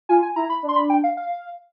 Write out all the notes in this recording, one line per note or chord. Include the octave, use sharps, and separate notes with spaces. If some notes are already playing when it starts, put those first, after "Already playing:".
F4 G#5
G#5
E4 A#5
B5
D4
C6
B5
G5
F5
F5